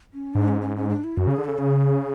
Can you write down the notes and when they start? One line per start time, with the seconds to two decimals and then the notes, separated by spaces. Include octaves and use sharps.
0.14 C#4
0.34 G#2 D4
0.48 C#4
0.61 C#4
0.76 C#4
0.89 D4
1.04 E4
1.17 F#2 F#4
1.27 C#3
1.31 G#4
1.38 D3
1.45 C#3 A4
1.58 C#3 G#4